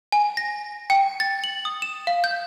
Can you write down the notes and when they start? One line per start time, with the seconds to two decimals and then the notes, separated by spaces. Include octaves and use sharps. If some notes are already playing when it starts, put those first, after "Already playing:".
0.12 G#5
0.37 A#6
0.90 G5
1.20 A6
1.44 F#7
1.65 D#6
1.82 E7
2.07 F5
2.24 G6